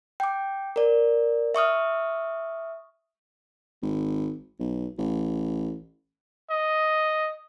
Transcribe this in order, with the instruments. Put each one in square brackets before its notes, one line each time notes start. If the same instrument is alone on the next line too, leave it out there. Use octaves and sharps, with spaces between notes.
[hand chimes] G5 D6
A#4 D5
E5 C#6 D#6 F6
[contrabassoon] G#1
B1
A1
[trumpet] D#5